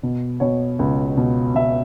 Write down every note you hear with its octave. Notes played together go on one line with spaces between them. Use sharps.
B2
B2 C#5
C#2
B2
B2 E5